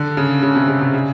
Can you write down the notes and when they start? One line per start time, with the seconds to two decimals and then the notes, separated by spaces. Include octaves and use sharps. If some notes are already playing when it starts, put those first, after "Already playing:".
Already playing: D3
0.17 C#3
0.43 C#3
0.55 C3
0.68 C#3
0.81 C3
0.94 C#3